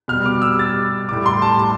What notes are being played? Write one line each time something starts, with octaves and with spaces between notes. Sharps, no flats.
B2 G3 F6
D6
E6
A6
A2 G3 D6
C6
A5
A5